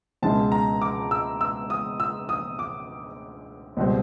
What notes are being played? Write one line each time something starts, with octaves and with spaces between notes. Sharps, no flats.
C#2 B2 G#3 C#4 E4 A5
A#5
D6
E6
E6
D#6
E6
D#6
D6
C#2 B2 G3 C4